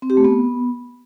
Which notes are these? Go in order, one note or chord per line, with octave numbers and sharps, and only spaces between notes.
C4
G4
A3
B3